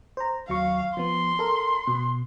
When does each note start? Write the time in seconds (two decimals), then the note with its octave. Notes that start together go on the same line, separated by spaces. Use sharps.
0.17 C5 A#5
0.49 D#2 F#3 F5 C#6
0.97 F3 B3 C6
1.39 A4 A#4
1.87 B2